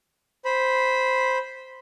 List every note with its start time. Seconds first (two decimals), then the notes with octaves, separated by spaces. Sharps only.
0.45 C5 B5